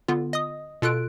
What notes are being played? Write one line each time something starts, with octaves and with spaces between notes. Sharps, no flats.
D3 B3 F4
D#5 D#6
B2 F4 A4 F#6 D7